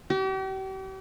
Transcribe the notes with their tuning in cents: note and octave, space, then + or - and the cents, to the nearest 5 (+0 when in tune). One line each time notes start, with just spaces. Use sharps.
G4 -40